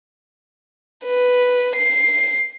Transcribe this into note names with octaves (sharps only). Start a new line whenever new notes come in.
B4
C7